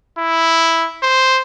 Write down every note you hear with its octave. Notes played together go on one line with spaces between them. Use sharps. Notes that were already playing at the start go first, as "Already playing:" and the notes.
E4
C5